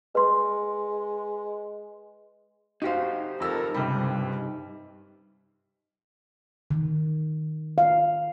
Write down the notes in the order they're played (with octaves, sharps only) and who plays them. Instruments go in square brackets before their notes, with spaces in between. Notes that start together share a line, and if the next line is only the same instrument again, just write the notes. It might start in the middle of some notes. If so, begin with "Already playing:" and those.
[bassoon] G#3 [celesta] B4 C6
[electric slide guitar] D#4 G4 C5 [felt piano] F#4 F5
[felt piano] F2 E6 [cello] A4 A#4
[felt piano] C#2 G3 [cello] G2 C3
[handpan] D#3
F5